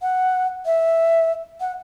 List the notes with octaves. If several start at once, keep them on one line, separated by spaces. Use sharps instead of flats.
F#5
E5
F#5